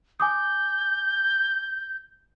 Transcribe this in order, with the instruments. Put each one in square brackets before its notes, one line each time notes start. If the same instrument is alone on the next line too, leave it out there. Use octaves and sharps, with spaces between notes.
[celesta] G#5 D6 D#6 [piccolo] G6